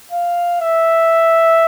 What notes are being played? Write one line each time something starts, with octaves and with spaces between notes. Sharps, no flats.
F5
E5